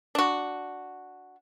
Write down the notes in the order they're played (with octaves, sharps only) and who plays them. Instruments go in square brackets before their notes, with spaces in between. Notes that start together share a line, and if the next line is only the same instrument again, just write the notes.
[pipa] D4 F#4